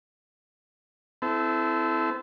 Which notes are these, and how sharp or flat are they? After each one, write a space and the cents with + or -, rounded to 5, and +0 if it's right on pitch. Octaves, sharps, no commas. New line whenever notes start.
C4 -30 E4 +0 A4 -20